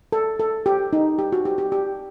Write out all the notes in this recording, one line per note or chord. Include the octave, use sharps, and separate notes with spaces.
A4
A4
G4
D#4
G4
F#4
G4
G4
G4